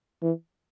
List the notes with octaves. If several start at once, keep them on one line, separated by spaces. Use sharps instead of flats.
E3